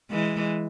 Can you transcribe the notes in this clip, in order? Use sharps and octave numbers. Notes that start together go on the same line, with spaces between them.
E3 G#3